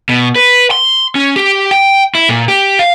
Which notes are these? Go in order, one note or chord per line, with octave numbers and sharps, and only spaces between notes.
B2
B4
C6
C#4
G4
G5
E4
A#2
G4
F5